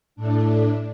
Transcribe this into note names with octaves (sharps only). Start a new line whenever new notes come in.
A2 A3 D4